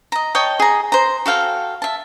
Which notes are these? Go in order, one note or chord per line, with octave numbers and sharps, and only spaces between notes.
D#5 A#5
C#5 D#5 G5 A5
G#4 A#5
C5 A#5
F#4 A4 F5 G5
E5 A5